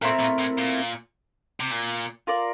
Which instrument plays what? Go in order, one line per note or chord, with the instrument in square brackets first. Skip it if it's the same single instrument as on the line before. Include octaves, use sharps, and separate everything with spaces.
[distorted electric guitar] A#2 [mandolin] A3 C4 E4 A#4
[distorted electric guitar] A#2
A2
A#2
C3
A#2
[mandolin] F4 A#4 D5